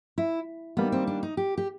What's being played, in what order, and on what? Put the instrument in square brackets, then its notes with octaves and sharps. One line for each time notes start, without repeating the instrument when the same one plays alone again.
[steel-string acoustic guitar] E4
[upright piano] D#3 G3 A#3 [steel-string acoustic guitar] B3
[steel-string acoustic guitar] C4
D4
D#4
G4
G4